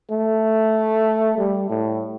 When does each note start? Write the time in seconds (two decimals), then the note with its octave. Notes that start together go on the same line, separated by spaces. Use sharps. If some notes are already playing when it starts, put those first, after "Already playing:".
0.11 A3
1.38 G3
1.70 A2